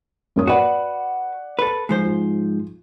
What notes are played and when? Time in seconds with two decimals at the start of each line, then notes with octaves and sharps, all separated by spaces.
0.36 F#2 A#3 D#6
0.47 F#4 B4 D5 F#5
1.59 A4 B4
1.89 G#2 F3 C5
2.05 F4